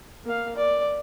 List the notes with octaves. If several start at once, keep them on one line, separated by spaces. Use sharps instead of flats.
A#3 F5
D5